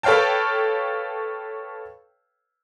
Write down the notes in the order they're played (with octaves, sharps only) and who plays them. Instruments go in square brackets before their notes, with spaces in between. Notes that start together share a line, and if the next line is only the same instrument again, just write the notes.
[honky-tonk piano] A4 B4 C#5 F5 G5 A5